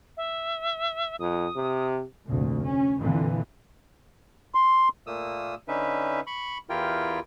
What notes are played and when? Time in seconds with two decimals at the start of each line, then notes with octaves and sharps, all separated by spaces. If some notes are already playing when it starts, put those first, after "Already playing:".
0.17 E5
1.20 F2 D#6
1.56 C3
2.28 F1 D2 A#2
2.63 C#4
3.00 F2 A#2 D3 E3
4.55 C6
5.07 A#2 A3 A#3 D#6 E6
5.68 D3 C#4 D#4 B4 E5
6.27 B5 C#6
6.70 E2 E4 F4 G4 A#4 G5